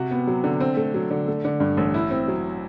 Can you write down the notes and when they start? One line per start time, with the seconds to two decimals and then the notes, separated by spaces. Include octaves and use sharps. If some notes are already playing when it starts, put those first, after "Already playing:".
Already playing: C3 F#4
0.11 B3
0.27 F#3
0.44 D3
0.60 C4
0.77 A3
0.94 F#3
1.11 D3
1.28 A3
1.45 D3
1.60 G2
1.77 A1
1.94 E4
2.11 C4
2.28 F#3